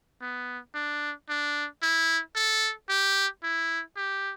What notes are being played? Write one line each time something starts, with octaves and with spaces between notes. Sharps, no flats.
B3
D4
D4
E4
A4
G4
E4
G4